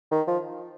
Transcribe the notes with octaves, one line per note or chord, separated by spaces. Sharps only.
D#3
F3